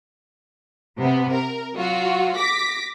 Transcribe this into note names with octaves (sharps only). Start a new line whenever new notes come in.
C3 B3
A#4
F#3 F4 F#4
D6 A#6 B6